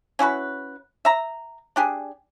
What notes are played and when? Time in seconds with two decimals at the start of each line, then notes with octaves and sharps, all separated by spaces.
0.19 C#4 E4 F#4 B4
1.05 E5 A#5
1.76 D4 G4 G#4